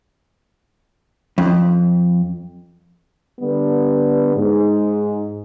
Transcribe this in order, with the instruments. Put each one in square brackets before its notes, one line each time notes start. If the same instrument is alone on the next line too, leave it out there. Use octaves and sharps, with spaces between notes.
[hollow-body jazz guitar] F2
[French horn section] D3 G3 B3
G#2